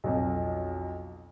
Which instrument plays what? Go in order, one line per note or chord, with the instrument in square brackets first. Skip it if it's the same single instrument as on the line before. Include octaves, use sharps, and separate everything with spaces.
[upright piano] B1 F2